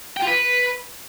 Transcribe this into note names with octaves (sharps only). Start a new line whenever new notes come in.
G5
F4
B4